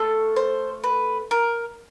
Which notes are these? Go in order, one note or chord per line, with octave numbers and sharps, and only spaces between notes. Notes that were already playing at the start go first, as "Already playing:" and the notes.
Already playing: A3 F4 A4
C5
B4
A#4